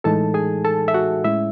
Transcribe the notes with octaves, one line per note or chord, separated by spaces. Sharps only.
A2 E3 G#3 D#4 A4 A5
G#4 G#5
A4 A5
E5
F#4 F#5
A2 G#3 C#4 E4 E5